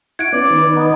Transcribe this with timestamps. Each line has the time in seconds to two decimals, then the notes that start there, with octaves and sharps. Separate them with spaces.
0.19 E4 F#5 C#6 G#6 D7
0.33 B3 C#4 D5
0.51 D#3 B4
0.75 B3 D#4